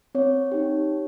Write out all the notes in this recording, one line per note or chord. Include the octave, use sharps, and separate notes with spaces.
C4 C#5
D#4 G4